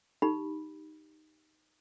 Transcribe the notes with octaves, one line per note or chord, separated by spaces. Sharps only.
D#4 G4 B5